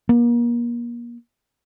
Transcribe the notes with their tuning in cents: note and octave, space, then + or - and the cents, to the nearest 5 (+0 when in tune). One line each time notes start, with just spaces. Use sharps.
A#3 +35